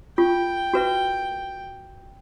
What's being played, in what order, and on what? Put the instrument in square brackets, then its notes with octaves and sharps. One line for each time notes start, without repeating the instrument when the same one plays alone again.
[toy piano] F4 [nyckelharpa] G5
[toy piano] F#4 B4 E5